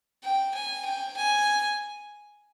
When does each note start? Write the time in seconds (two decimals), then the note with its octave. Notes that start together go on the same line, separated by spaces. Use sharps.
0.23 G5
0.54 G#5
0.85 G5
1.16 G#5